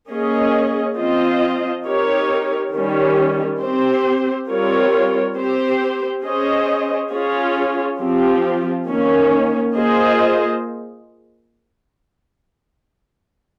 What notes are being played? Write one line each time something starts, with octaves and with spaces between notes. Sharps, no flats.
A#3 C#4 G#4 D#5
F3 C4 F4 C5 D#5
C4 D#4 G4 A#4 C#5
D#3 G3 C#4
C4 G4 C5
G3 C4 F4 A#4 C#5
C4 G4 C5
C#4 G#4 C5 D#5
C#4 F4 G#4 C#5
F3 C4 G4
D#3 A#3 C#4
A#3 F4 G#4 C5 D#5